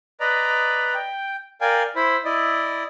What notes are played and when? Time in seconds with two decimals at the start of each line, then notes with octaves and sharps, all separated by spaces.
0.20 B4 D5 D#5 A#5
0.94 G5
1.61 A#4 D5 F5 G5 G#5
1.96 E4 C5 B5
2.25 E4 D5 D#5